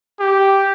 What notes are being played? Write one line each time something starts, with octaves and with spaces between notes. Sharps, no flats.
G4